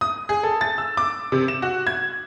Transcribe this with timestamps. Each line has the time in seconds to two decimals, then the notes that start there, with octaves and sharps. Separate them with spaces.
0.01 D#6
0.29 G#4
0.43 A4
0.61 A6
0.78 E6
0.97 D6
1.32 C3
1.48 E7
1.62 F#4
1.87 G#6